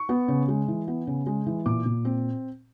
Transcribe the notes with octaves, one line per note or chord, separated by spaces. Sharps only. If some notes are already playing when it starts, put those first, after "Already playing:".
Already playing: C#6
B3
C#3
G#3
E3
B3
C#3
G#3
E3
A#2 D6
A#2
C4